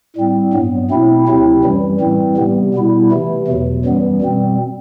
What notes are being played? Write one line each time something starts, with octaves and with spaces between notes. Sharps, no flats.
A2 G3 C4
G2 F#3 B3
B2 A3 C4 E4
D2 C3 F#3 C4 E4
F#2 E3 G3
A2 E3 G3 C4
C3 G3 B3
B2 G3 B3 E4
C3 E3 A3
E2 B2 F#3
F#2 E3 G3 B3
B2 G3 C4